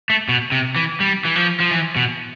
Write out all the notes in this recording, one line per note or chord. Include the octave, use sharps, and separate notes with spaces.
A3
B2
C3
E3
G3
E3
F3
F3
E3
B2